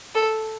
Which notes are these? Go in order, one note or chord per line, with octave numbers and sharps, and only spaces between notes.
A4